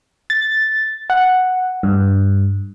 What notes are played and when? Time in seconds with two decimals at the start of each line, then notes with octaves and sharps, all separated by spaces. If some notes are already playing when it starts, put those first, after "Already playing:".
0.30 A6
1.10 F#5
1.83 G2